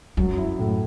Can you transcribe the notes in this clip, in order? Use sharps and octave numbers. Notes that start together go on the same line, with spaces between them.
F#2 F#3
E4
A2